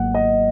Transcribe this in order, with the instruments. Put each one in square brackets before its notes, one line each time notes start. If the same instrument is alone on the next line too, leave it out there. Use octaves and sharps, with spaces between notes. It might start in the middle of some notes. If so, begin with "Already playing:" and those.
Already playing: [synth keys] G#1 G#2 F#3 A#3 [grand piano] F#5
[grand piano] D#5